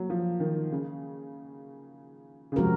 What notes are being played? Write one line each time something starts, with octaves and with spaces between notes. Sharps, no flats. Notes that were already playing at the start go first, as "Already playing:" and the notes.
Already playing: F#3 A#3
F3
D#3
C#3
C#3
C3 F3 G#3 C4 F#4 A#4